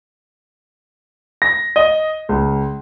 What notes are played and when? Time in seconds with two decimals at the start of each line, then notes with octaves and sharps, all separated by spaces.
1.42 A#6
1.76 D#5
2.29 C#2